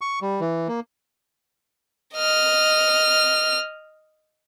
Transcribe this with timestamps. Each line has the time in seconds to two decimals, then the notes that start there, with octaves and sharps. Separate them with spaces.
0.01 C#6
0.22 G3
0.41 E3
0.68 A#3
2.15 D#5 F6